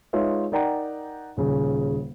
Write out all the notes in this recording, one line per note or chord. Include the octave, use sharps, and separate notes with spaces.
G#3 D#4 F4 B4 C#5 E5
D#4 A#4 D5 F#5 G5 A#5
D#1 C#3